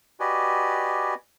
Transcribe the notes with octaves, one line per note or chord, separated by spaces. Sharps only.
F#4 G4 B4 D5 D#5 G#5